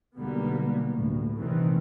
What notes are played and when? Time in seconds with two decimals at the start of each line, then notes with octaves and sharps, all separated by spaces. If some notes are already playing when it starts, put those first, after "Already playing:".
0.16 B1 D3 G3 A#3 B3
0.91 D2 A2
1.38 C2 A#2 D#3 E3 A3 C4